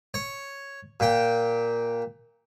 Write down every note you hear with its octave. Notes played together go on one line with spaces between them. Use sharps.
C#5
A#2 G5